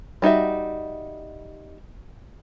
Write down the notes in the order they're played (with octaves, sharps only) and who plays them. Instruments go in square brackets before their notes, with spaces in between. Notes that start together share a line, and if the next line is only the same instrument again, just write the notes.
[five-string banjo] G3 D#4 F#4 E5